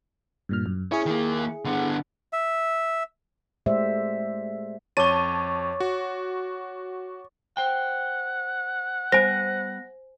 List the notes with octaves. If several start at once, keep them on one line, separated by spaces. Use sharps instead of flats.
G2 A#2 F6
F#2
C#4 E4 G#4 C#5
D#3 A#3
D3 B3
E5
G#3 A3 G4 C5 D5 E5
F2 C#5 A5 C#6 D6 A6 D#7
F#4
C5 F#5 G5
G3 B3 C5 G#5 A#6